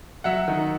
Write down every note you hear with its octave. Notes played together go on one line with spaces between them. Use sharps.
F#3 E5 F#5
D#3